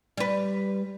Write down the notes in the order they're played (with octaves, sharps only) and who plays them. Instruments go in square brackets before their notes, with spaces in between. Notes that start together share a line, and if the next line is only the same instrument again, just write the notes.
[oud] G3 B4